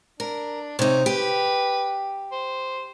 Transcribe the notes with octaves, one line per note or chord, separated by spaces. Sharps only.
D4 A#4
C3 D#4 C#5
G4 B4
C5